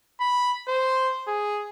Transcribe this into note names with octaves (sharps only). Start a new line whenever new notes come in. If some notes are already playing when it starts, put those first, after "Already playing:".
B5
C5
G#4